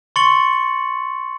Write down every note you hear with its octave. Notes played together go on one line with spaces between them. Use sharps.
C6 C#6 A6 C#7 F#7